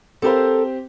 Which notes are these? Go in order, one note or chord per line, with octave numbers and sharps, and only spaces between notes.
C4 G4 A4 A#4 C5 F5